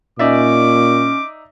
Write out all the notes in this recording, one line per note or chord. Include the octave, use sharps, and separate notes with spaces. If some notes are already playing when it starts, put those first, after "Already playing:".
A#2 C#4 D#4 D5 E5 D6